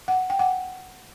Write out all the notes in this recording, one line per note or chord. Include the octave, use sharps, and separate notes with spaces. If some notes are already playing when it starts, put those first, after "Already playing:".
F#5
G5
F#5